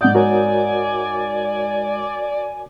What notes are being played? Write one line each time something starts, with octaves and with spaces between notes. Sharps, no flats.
G#2 D5 F#5 D#6 G6
F#4 A#4 C#5 G#5